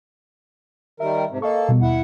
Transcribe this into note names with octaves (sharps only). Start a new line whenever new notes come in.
D#3 G3 A#4 E5
G#2 C3
A#3 A4 D#5 F5 C#6
B2 G3 B3
D#2 E4 F#5